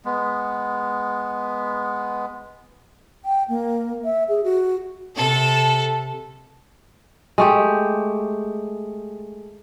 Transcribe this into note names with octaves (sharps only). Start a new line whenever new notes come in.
G#3 B3
G5
A#3
E5
G#4
F#4
C3 A4
G#3 A3 G4